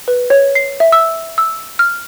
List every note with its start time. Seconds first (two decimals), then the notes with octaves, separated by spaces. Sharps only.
0.08 B4
0.30 C#5
0.55 C7
0.80 E5
0.92 E6
1.38 E6
1.79 F6